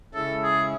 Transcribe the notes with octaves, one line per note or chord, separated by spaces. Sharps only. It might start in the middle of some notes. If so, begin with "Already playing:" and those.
C#3 G#3 C#4 E4 A4
G#4